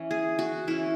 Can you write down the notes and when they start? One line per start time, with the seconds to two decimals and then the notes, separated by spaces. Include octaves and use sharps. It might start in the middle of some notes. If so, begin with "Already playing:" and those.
Already playing: E3 C#4
0.11 G#4
0.39 F#4
0.67 E3 C#4 E4